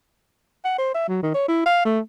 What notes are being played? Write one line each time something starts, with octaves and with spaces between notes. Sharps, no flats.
F#5
C5
E5
F#3
D#3
C#5
E4
F5
A3